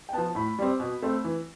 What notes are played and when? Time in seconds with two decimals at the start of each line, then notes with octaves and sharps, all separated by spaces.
0.09 G5
0.13 F3 B3 A5
0.35 A2 B5
0.59 G3 C4
0.80 B2
1.02 A3 C4
1.24 E3